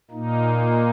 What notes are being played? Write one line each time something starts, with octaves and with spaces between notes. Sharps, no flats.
A#2 A#3 D#4